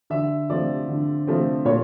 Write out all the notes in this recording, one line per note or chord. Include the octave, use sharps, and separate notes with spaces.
D3 E5
F3 A3 C4 D5
D3
F3 A3 C4
A#2 C#5